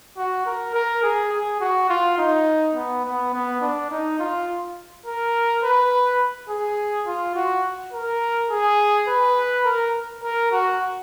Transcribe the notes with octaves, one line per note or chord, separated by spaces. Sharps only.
F#4
A#4
A#4
G#4
G#4
F#4
F4
D#4
B3
B3
B3
D4
D#4
F4
A#4
B4
G#4
F4
F#4
A#4
G#4
B4
A#4
A#4
F#4